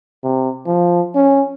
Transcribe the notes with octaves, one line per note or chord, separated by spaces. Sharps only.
C3
F3
C#4